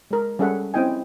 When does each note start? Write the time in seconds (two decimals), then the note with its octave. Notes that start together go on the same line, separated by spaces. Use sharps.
0.11 G#3 A#4
0.39 G3 C#4 G#4 A4 E5 F#5
0.74 C4 C#4 E4 D#5 G5 G#5